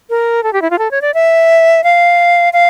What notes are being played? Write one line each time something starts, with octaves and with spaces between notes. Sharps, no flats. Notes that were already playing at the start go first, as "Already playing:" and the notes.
A#4
A4
G4
E4
F4
A4
C#5
D5
E5
F5
F5